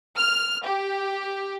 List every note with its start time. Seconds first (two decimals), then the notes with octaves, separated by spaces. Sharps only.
0.18 F6
0.66 G4